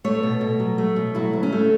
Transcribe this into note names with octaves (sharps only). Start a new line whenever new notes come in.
A3 C#5
B2
B2
F#3
A3
B2
F#3 E4
D2
C#4
A3